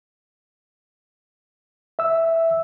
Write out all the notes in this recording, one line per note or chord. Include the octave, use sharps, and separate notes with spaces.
E5 E6